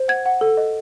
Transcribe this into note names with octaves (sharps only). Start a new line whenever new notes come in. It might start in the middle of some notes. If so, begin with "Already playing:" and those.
Already playing: C5
F#5 G#6
F#5
A4
D#5